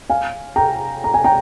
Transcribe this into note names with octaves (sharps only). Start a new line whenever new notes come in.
F5 G#5
G5 A#5
A#5
G#5
G5 A#5